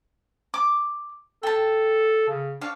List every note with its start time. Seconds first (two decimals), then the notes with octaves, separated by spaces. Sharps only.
0.54 D6
1.43 A4 G5 A5
2.29 C#3
2.61 D4 C#5 F5